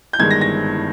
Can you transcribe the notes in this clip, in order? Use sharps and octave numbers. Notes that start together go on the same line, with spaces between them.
G6
G1 G2 D#3 G#3 G#6
A#6
A#6